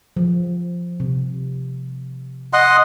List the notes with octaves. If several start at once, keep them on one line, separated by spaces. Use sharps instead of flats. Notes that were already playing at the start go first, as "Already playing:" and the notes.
F3
C3
D#5 F#5 C6